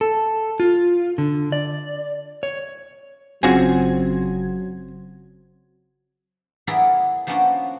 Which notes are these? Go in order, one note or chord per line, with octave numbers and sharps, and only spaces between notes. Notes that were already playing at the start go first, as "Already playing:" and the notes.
A4
F4
D3
D5
C#5
G1 C#3 F#3 C4 F4 F#4 G#5 G#6
F#3 B3 E4 G#4 A#4 D5
F3 A#3 B3 C#4 D4 F#4